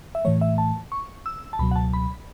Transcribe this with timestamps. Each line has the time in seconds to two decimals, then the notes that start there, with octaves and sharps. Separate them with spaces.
0.15 E5
0.25 A2 E3 A3 C#5
0.41 E5
0.58 A5
0.92 C#6
1.26 E6
1.53 A5
1.59 C#2 B2 F#3 B5
1.71 F#5
1.76 A5
1.93 B5